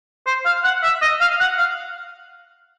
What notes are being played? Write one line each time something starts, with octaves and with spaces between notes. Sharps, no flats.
C5
F5
F#5
E5
D#5
F5
F#5
F5